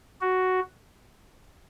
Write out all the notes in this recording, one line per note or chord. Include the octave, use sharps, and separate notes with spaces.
F#4